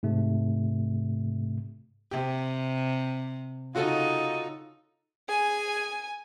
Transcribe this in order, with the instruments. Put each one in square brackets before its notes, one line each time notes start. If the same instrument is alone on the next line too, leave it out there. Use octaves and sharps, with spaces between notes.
[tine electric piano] G#2 C3 A3
[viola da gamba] C3 [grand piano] G4
[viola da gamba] C#3 D#4 [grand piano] F4 F#4 A4
[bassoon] G#4 [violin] G#5